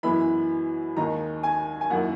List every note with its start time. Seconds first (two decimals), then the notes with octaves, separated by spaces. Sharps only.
0.03 F#2 E3 G#3 B3 E4 B5
0.97 D#2 D#3 G#3 D#4 A#5
1.43 G#5
1.81 G#5
1.90 F#2 D#3 A#3 E4 F#5